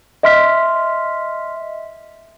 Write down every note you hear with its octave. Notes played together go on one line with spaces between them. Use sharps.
D#5 E5 C6 F6 B6